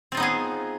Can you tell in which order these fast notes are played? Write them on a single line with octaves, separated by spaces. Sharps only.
C4 F4 D#4 B3 G#4